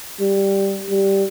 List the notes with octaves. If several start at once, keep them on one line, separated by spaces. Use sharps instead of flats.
G3
G3